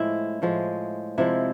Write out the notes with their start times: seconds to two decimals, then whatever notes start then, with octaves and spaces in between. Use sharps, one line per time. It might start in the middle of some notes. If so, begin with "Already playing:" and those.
Already playing: A2 F3 G#3 E4
0.42 A2 F3 G#3
1.18 C3 F3 G#3 E4